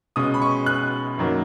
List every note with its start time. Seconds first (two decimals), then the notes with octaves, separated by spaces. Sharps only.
0.16 B2 G#3 C#4 D#6
0.34 B5
0.42 C#6
0.66 F#6
1.17 F#2 D#3 F#3 A#3